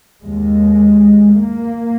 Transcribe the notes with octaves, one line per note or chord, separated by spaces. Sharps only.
D#2 G#3
A#3